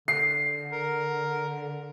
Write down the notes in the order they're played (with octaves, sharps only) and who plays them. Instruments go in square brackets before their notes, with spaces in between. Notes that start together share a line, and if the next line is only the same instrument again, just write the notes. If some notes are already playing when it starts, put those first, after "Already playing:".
[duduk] D3 [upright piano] C7
[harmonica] A#4